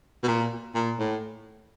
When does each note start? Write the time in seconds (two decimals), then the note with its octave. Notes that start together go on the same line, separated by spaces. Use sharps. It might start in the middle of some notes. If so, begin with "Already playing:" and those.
0.23 B2
0.28 A#2
0.75 A#2
0.99 A2